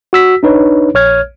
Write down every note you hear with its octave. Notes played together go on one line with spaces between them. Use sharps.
F#4 E6 B6
D4 D#4 B4 C#5
A#1 C#5 F6 G#6